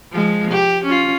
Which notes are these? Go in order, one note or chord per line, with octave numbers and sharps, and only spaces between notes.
F3 G#3
G4
C#4 F4